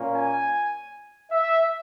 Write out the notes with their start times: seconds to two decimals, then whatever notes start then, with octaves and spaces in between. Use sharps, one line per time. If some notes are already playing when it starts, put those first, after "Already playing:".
Already playing: A#2 A#3 C#4
0.12 G#5
1.32 E5